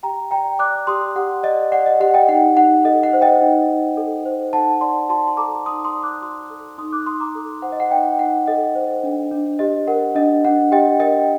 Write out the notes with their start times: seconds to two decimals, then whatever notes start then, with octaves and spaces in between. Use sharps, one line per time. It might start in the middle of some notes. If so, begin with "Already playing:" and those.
0.03 G4 G5 A#5
0.31 D5 G5 A#5
0.59 D5 D6 F#6
0.87 G4 C6 D#6
1.16 G4 F#5
1.43 D5 D#5
1.72 D5 F#5
1.86 D#5
2.00 G4 F#5
2.14 D#5 G5
2.28 D#4 F#5
2.57 D#4 F#5
2.84 A4 D#5
3.03 F#5
3.13 C5
3.21 D#5 G5
3.41 D#4
3.68 D#4
3.97 A4
4.26 C5
4.53 D#4 F#5 A5
4.81 D5 A5 C6
5.09 F#4 A5 C6
5.28 C6
5.37 A4 A#5 D6
5.66 D#4 C6 D#6
5.84 C6 D#6
5.94 D5
6.03 D6 F#6
6.22 F#4 C6 D#6
6.50 A4
6.78 D#4 C6 D#6
6.92 D6 F#6
7.06 D#4 C6 D#6
7.20 A#5 D6
7.35 A4
7.62 C5 F#5
7.72 D#5
7.80 F#5
7.91 D#4 D#5 G5
8.19 D#4 F#5
8.48 A4 D#5
8.75 C5
9.03 D4
9.31 D4
9.59 G4 D#5
9.87 A#4 F#5
10.15 D4 D#5
10.45 D4 F#5
10.72 G4 D#5 G5
11.00 A#4 D#5 G5